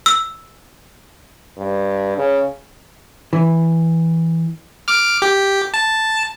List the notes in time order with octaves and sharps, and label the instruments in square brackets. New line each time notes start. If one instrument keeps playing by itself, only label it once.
[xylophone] E6
[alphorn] G2
C#3
[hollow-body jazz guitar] E3
[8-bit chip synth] D6 F6
G4
A5